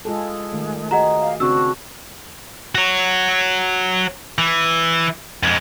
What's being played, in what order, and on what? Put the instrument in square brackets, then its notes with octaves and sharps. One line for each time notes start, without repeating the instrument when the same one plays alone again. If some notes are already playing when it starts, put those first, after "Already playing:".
[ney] G#3 [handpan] F4 G#4 A4
[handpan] D#3 A3
[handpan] F#4 G#4 [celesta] D#5 F#5 A#5
[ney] F5
[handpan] C#3 C4 D4 [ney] F#4 [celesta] E6
[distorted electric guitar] F#4 C#5
E3
F2 G#3